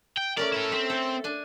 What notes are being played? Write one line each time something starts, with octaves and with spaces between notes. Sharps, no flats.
G5
A3 C#4 A#4 D5
E4 A4
C4 E5
A4
D4 G#5